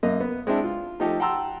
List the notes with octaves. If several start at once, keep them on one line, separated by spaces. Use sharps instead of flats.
F#2 A#3 D#5
B3
G#3 C4 D4 E4
F4
F3 A3 D#4 G4 A4
F#5 G5 A5 A#5 C6 E6